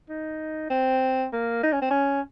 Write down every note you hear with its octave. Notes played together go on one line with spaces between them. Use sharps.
D#4
C4
A#3
D#4
C#4
C4
C#4